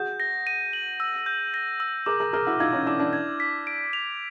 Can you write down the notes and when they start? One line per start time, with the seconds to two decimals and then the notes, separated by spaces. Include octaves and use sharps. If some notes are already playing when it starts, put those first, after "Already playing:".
Already playing: F#4 G#4 G6
0.20 A#6
0.47 D#7
0.73 F#7
1.00 E6
1.26 G6
1.54 A#6
1.80 E6
2.06 G#4 A#4 D6
2.20 G#4 A#4
2.33 G#4 A#4 F6
2.47 E4 F#4
2.60 D#4 F4 G#6
2.73 C#4 D#4
2.86 D4 E4 D6
2.99 D4 E4
3.13 G#6
3.40 B6
3.67 D7
3.93 F7